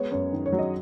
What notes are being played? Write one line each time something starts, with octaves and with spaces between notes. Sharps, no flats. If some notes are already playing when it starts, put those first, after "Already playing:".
Already playing: G#3 B3 C#5
F#2 C#5
D#3
C#5
F#3
D#5